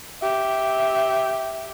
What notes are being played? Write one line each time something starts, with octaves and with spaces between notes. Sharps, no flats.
G4 E5